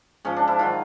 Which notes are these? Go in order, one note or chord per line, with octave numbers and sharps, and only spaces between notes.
G#2 F3 C#4
D4
E4
D#3 F#3 F4